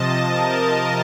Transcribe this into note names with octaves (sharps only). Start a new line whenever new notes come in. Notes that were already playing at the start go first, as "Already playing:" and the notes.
Already playing: C3 F3 D#5 A5
A#4